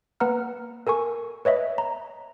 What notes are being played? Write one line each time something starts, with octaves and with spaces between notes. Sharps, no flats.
A#3 B4 F#5 A#5 F6
A4 A#4 G#5 C#6
B4 C#5 D#5 E5
A#5